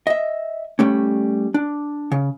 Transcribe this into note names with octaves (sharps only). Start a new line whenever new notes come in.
D#5 E5
G3 A3 C#4
D4
C#3